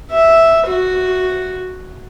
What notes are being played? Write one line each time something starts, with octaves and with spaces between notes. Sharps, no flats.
E5
F#4